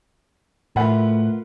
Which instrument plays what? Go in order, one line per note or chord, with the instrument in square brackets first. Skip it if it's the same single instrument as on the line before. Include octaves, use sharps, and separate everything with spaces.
[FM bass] A2 [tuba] A3 [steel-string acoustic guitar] F4 A#4 B4 [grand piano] E5 F#5 B5